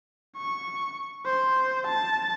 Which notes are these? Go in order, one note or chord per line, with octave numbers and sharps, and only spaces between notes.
C#6
C5
A5